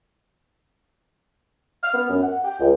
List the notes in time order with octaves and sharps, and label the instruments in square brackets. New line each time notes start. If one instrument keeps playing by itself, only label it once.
[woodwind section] F6
B3
F#2
F#5
G5
C#2